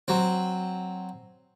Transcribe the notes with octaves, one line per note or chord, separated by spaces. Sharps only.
F#3 C4